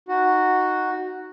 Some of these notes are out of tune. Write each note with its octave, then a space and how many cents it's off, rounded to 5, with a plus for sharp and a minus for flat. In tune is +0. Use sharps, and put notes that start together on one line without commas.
D#4 +0 F#4 +0